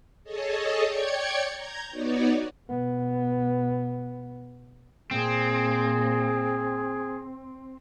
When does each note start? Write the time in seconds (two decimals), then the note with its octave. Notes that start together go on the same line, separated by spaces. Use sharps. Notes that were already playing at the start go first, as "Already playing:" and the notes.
0.24 G#4 A4 C#5 D#5 A5
0.82 C#5 D5 G5 G#6 C#7
1.55 A#5 G6 G#6
1.90 B3 D#4 F#4 C#5 D5
2.69 B2 B3
5.11 A#2 C4 G#4